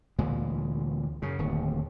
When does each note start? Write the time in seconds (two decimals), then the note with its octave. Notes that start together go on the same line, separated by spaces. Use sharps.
0.18 D2 A#2 E3 G#3
1.22 F#2 C#3
1.39 D1 D#2